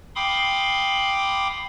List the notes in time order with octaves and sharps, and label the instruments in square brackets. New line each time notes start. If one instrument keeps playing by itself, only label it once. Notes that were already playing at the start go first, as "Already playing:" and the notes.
[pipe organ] F5 G5 B5 C6 D6 D#6